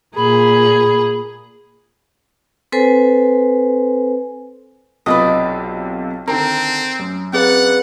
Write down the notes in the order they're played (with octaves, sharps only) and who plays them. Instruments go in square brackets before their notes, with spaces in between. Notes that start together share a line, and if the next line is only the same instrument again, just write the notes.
[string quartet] A#2 [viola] G#4 [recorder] B5
[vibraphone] C4 A4 B4 C5 G#5
[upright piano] B1 C3 F4 [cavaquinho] B4 D5 D#5
[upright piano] D3 D#3 [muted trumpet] C4 [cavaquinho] A#4
[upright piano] F#2
[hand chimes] C4 G#4 B4 [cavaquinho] D5 F5 [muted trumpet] F#5